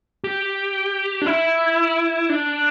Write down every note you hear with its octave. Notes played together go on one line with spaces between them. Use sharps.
G4
D4
E4
D4